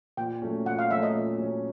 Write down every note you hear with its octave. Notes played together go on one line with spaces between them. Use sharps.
A#2 G5
F#3 A3 C#4
A#2 F#5
F5
F#3 A3 C#4 E5
D#5
A#2
F#3 A3 C#4